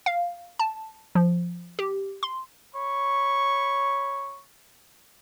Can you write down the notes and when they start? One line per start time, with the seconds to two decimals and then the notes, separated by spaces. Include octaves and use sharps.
0.06 F5
0.59 A5
1.15 F3
1.79 G4
2.23 C6
2.74 C#5 B5 C#6